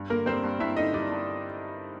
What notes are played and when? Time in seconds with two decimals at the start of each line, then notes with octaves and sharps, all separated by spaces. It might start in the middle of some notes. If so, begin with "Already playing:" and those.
Already playing: G2
0.10 D3 A#3 A#4
0.26 G3 C4 C5
0.43 G2
0.60 G2 E4 E5
0.76 D3 D#4 D#5
0.93 G3 D4 D5
1.11 G2